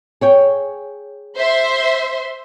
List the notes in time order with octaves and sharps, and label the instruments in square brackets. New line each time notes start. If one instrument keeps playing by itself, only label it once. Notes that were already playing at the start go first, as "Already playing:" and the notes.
[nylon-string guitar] G#4 C#5 G5
[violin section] C5 E5 C6